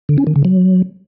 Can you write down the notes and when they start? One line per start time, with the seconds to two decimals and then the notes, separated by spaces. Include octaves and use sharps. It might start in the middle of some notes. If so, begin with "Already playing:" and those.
0.09 D3
0.18 C#4
0.27 D#3
0.36 C#3
0.45 F#3